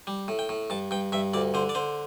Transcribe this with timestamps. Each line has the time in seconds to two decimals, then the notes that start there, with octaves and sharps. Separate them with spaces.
0.07 G3
0.28 A2
0.39 G5
0.49 A2
0.70 G2 A5
0.91 G2 G5
1.12 G2 E5
1.34 D2 D5
1.54 D3 C5
1.69 D5
1.75 D3 C5